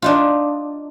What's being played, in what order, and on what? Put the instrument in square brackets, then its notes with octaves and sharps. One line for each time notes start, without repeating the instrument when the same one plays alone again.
[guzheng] D4 D#4 F4